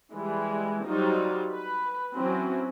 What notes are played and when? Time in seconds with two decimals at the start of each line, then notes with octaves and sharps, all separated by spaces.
0.13 E3 G3 G#3
0.87 F#3 G3 D#4 F4 C5
1.52 B4
2.15 E3 F#3 C4 C#4